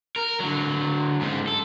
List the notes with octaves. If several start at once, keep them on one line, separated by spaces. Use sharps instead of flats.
A#4
D3 F#3
G#2 C#3
A4